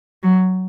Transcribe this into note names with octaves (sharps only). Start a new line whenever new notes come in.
F#3